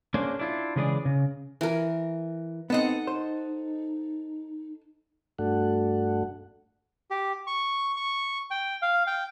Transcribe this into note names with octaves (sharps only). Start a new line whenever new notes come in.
A#3 C#4 D4 G#4 C5
D4 E4 F4
C#3 E3 G#3 G#4 C5 D5
C#3
E3 A#4
B3 C4 D#4 A4 D#5 F#5
C5
G2 A3 D4 F#4 A4 F#5
G4
C#6
C#6
G5
F5
G5